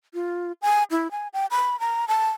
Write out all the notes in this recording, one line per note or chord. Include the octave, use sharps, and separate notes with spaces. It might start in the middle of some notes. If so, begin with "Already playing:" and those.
F4
G#5
E4
G#5
G5
B5
A#5
A5